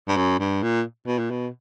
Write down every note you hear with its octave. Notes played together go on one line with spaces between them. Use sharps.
G2
F#2
G2
A#2
B2
A#2
B2